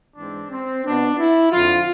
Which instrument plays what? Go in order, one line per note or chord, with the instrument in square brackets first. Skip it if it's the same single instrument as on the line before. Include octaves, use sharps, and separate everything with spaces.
[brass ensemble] G#2 E3 G#3 C4 D4
C4
B2 B3 D4
E4
F2 D3 F3 F4